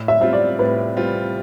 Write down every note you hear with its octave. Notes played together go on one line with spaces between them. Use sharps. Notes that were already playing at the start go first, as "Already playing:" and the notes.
Already playing: A2
E5
G3 C4 F4 E5
D5
A2 B4
G3 C4 F4